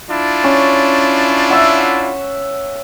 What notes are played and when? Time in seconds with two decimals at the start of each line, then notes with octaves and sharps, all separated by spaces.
0.10 D4 E4 F4
0.44 C#4
1.50 E5 F#5